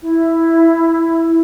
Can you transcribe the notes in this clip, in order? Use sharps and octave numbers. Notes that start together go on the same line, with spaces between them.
E4